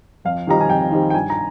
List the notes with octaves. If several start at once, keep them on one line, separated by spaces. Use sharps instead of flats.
F2 F5
D#3 G3 C4 D#4 A#5
G#5
F2 G5
D#3 G3 C4 D#4
G5
G2 G#5
A#5